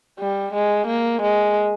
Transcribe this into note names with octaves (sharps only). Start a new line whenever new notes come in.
G3
G#3
A#3
G#3